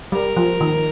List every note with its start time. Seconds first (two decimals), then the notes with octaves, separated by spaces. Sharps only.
0.12 G3 A#4
0.36 F3
0.61 D#3